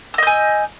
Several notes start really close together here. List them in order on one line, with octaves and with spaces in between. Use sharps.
E6 D#5 G6 G#5